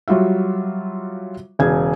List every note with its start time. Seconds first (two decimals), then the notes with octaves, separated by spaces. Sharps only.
0.08 F#3 G3 F4 F#4 E5
1.59 E1 C#3 G#4 G#6